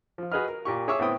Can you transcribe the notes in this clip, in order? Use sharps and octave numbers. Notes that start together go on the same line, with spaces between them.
F3 F4
F#4 G#4 B4 D#5 F6
A#4
A#2 G4 C#6
G#4 C#5 E5 C#6 D6 E6
A2 B3 C4 E4 G5 D#6